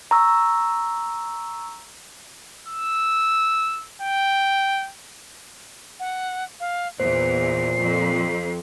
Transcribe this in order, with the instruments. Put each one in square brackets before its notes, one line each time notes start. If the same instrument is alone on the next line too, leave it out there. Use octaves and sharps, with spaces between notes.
[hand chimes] A#5 C#6 E6
[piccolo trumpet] E6
G5
[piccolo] F#5
F5
[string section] E2 [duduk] A#2 [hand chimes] C5 [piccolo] C7
[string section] F2